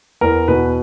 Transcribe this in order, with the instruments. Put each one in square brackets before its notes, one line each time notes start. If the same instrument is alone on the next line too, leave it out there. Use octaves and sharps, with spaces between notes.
[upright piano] E2 [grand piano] A#4
[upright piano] B2 [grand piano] B4